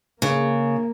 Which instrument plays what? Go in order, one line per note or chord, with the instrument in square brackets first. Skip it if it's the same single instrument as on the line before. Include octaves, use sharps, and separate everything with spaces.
[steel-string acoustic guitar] C#3 [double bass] A#3